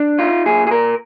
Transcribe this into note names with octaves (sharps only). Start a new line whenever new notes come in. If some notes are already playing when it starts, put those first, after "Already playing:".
Already playing: D4
D#4 F4
A#2 G#4
G#4
A#2 A#4